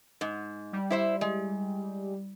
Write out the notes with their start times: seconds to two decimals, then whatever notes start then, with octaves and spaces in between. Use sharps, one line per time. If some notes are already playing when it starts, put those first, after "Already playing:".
0.21 G#2
0.73 G3
0.90 E4 C5 E5
1.21 G#3